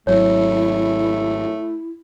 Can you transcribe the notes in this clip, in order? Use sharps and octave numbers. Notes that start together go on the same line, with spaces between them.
G#1 F#3 A3 E4 C#5